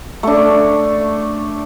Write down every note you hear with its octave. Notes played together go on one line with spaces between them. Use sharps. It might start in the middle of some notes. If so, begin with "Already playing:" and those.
A3 D4